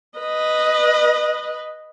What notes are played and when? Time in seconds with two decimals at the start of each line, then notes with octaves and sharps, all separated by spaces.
0.19 B4 D#5